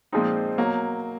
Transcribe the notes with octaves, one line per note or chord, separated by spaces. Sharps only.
A#2 F3 G#3 C4 D#4
B2 F#3 A#3